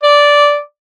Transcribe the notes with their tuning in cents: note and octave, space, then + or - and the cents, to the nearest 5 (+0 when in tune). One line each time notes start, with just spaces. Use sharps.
D5 -10